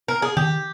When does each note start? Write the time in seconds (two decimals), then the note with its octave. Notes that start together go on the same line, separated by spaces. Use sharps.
0.08 A#4
0.22 G#4
0.36 D#3 G4